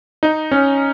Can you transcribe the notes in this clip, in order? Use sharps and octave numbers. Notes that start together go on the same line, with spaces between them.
D#4
C#4